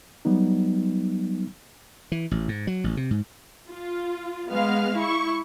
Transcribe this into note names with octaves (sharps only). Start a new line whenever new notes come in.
F#3 G3 B3 D#4
E3
A1
G#2
F#3
A1
C3
G#2
F4
G#3 B3 F5 F6
E4 C#6